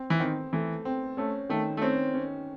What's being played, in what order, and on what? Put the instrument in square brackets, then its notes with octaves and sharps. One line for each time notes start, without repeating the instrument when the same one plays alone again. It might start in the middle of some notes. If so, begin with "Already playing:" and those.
Already playing: [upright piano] C4
[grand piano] E3
[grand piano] D#3 [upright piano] C4
[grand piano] E3 [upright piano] A3
[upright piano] C4
[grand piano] A3 [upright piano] C#4
[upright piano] D#3 [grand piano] A3
[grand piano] A3
[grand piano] C4 [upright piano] C#4
[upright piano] C#4